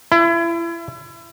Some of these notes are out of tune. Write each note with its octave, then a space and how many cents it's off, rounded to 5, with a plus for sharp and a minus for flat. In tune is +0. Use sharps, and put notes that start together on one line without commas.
E4 +30